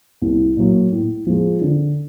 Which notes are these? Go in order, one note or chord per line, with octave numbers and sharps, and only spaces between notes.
C2
A#2 F#3
A2
F3 G#3
D3